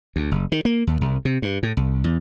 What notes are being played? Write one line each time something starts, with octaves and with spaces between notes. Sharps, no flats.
D2
F#1
D#3
A#3
D#2
C2
C3
G2
A2
C2
E2